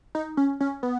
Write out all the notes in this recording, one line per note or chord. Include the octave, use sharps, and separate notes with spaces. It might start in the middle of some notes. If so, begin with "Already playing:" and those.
D#4
C#4
C#4
B3